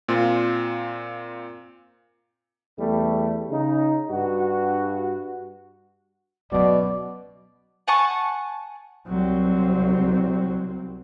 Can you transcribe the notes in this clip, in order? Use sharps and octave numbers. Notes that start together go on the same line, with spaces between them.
A#2 C4 F4
E2 G3 A3
C#3 D#4
G2 F#4
B2 F#3 C#4 D5
F#5 G#5 A5 C#6
C2 F#3 C4